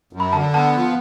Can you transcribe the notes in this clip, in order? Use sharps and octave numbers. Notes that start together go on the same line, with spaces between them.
F#2
B5
D3 A5
B3 A5
F3